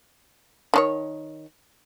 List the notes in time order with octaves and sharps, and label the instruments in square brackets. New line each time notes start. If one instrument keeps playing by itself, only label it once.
[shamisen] D#3 D4 C#5